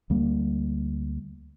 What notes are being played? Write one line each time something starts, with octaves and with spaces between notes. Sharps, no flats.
D2 G3 A#3